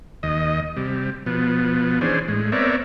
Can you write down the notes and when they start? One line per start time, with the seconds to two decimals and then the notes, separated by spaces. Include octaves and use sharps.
0.23 D#2 D#5
0.77 C3 G3
1.26 B2 F3 B3
2.01 E3 C#4 D4 G#4 C5
2.28 A2 G#3
2.52 B3 C4 A#4 C#5 D5 E5